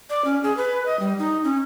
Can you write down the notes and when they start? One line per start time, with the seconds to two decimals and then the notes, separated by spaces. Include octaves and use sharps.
0.10 D5
0.25 C#4
0.43 G#4
0.57 B4
0.86 D#5
1.00 G3
1.19 D#4
1.44 C#4